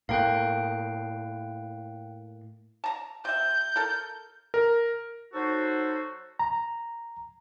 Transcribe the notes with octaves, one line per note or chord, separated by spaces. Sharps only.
A2 A#3 F5 G5 F#6
A5 A#5
C3 E5 G6
A4 A#4
A#4
F#3 D#4 F#4 A4 C5
A#5